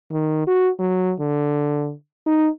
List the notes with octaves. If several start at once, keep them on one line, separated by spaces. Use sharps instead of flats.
D#3
F#4
F#3
D3
D#4